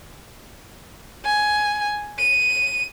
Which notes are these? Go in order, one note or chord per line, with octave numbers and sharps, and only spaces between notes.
G#5
D#7